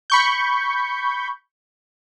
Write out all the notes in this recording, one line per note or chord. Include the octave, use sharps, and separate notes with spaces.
B5 C#6 G6